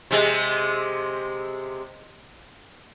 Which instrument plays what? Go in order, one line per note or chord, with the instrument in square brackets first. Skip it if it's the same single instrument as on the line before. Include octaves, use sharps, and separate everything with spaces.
[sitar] C3 G#3